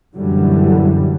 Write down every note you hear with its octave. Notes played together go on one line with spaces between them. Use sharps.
F#2 A#2 D3 E3 F#3 G3